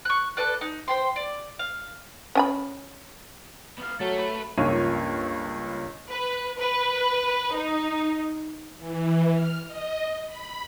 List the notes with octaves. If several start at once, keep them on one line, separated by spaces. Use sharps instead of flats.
C#6 F#6
A4 B4 D5 F#6
D#4
C5 G5 C6
D5
F5
C#4 G#5 B5
B3 F5
F#3 A3 A4
B4
C#2 G2 A#3 F4 C#5 D#7
B4
B4
D#4
E3
F6
D#5
B5